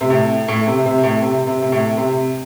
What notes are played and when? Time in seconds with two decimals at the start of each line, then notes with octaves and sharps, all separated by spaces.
0.01 C3
0.10 A2
0.48 A2
0.67 C3
0.86 C3
1.03 A2
1.22 C3
1.47 C3
1.62 C3
1.72 A2
1.97 C3